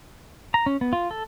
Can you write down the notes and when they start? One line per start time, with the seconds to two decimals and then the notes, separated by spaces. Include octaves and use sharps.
0.54 A#5
0.66 C#4
0.81 B3
0.93 F4
1.11 A4